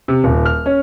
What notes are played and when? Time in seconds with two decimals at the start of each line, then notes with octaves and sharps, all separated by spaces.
0.08 C3
0.24 D#1
0.45 F6
0.66 C#4